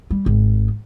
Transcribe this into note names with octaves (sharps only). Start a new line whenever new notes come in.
G3
G#1